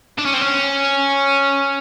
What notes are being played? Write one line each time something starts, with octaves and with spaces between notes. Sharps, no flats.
D4
C#4
C4
C#4